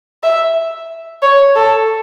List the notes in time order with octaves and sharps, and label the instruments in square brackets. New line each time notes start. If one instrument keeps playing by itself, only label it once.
[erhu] E5
C#5
A4